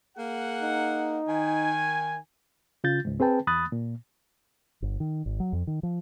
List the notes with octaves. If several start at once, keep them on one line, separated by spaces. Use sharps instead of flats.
A#3 G#4 F#5
D#4
D#3 G#5
C#3 F4 G6 A6
C#2 G#2
C4 G#4 B4 G5 A5
E2 B5 D#6 F#6 A6
A#2
G1
D#3
G#1
F#3
F2
D#3
F3